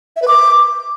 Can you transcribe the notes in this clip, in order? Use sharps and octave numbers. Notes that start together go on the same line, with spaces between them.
E5
B4
D6